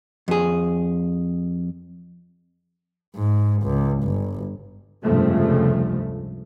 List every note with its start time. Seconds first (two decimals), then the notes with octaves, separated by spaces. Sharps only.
0.28 F2 G#4
3.16 G#2
3.63 C#2
4.04 G1
5.04 F1 C#2 G2 C3 F3 A3